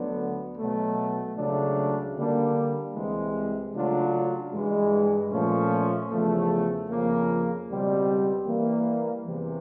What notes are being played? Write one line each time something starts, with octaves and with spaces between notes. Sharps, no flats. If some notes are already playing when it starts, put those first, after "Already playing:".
Already playing: D2 D3 F#3 B3
B2 F#3 A3
C#2 C#3 F#3 A3 D4
D3 G3 A#3 D4
C2 C3 E3 G#3
C#3 F#3 A3 D4 F4
G2 E3 G#3
A#2 F3 A3 C#4
E2 C#3 F3 A3
F2 C#3 F3 A#3
C#2 B2 G3 C4
E3 G3 A#3
E2 C3 E3